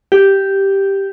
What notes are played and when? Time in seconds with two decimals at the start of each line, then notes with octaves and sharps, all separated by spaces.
0.12 G4